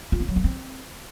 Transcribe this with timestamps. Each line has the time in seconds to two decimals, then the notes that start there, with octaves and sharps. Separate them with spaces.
0.12 F4
0.20 C4
0.28 F#3
0.36 D4
0.44 C4